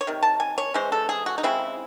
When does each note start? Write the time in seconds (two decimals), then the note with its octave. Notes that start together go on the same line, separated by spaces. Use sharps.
0.01 C#5
0.07 C3 D#3
0.23 A5
0.40 G#5
0.58 C#5
0.74 E3 G#3 C#4 C5
0.92 A4
1.09 G#4
1.26 F#4
1.38 D#4
1.43 C#3 G#3 C4 E4